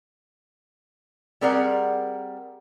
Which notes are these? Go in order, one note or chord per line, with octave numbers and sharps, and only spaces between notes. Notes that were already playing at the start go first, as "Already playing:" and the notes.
G3 C4 G#4 A#4 D5 F#5